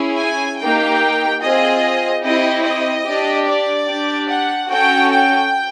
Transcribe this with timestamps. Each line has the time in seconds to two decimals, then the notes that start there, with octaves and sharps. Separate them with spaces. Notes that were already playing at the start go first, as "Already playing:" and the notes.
Already playing: C#4 E4 G#4
0.18 G#5
0.59 A#3 D#4 G4 G5
1.41 C4 F4 G#4 D#5
2.23 C4 E4 G4 D#5
2.64 D#5
3.05 D4 G4
3.46 D5
3.87 D4 G4
4.27 F#5
4.68 C#4 F#4 A4 G5
5.09 G5